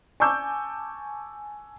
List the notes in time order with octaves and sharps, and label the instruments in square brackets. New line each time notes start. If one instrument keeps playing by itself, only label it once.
[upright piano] G#5 A5 C#6 D6 E6 G6